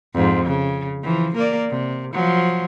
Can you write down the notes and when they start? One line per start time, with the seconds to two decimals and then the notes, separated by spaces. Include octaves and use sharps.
0.14 F2 G#2
0.45 C#3
1.03 E3 F3
1.35 A#3 A#4 D5
1.70 C3
2.13 F3 F#3